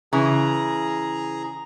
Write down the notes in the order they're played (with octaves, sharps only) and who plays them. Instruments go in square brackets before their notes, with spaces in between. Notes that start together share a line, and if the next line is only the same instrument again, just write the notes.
[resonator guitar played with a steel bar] C#3 E3 [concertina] G#4 A#5